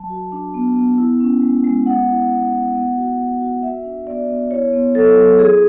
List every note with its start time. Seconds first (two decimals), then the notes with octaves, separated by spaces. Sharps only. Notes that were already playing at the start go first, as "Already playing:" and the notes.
Already playing: F#3 A5
0.10 F#4
0.32 D4
0.54 B3
0.76 B3
0.98 E4
1.20 C#4
1.42 G#3
1.64 G#3
1.86 B3 F#5
2.08 E4
2.30 B3
2.52 E4
2.75 B3
2.97 F#4
3.18 B3
3.40 F#4
3.63 F#4 E5
3.84 D4
4.07 B3 D5
4.29 B3
4.51 E4 C#5
4.73 B3
4.95 F#3 A4
5.17 F#3
5.39 E4 G#4